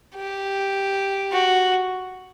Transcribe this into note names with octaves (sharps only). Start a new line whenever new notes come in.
G4
F#4